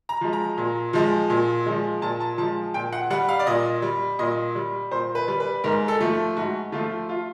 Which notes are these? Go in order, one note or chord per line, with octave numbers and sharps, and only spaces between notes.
A#5
F3 G#3
A#5
A#2
F3 G#3
A#2
F3 G#3
A#2 A5
A5
F3 G#3 A5
A#2 G5
F#5
G3 F#5
F5
D5
A#2 D#5
G3
A#2 D#5
G3
A#2 C5
B4
G3
B4
G#2 A#4
A4
F3 A3
G#2 F#4
F3 A3 F4
F4